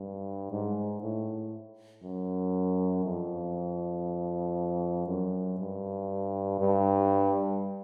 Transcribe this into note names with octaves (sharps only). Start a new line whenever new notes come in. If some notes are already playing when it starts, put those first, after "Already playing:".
Already playing: G2
G#2
A2
F#2
F2
F#2
G2
G2